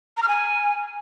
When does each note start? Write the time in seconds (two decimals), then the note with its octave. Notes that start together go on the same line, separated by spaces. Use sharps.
0.17 A#5
0.23 F6
0.28 G#5